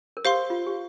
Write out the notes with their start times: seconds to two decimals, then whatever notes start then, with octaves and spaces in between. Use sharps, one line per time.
0.17 A#4
0.25 G4 C5 F5 C6
0.50 F4
0.67 G4